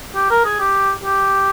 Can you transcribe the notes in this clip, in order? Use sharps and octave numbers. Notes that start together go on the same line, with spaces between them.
G4
A#4
G#4
G4
G4